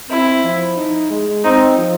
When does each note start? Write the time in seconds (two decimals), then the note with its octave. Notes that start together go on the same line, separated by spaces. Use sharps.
0.10 C4 E4
0.43 F3
0.77 D#4
1.10 G#3
1.44 C4 D#4
1.77 F3